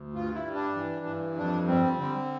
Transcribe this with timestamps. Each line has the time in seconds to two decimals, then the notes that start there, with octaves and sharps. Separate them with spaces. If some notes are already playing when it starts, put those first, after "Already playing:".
Already playing: D2
0.14 G2 F4
0.35 E4
0.45 G3
0.55 D4
0.75 E3
1.06 G2
1.37 F2 D4
1.68 G3 C4
1.99 D3 C4